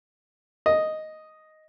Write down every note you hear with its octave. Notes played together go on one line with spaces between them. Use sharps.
D#5